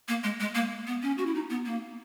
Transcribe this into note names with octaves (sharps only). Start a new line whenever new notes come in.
A#3
G#3
G#3
A#3
B3
C#4
F#4
E4
D#4
B3
A#3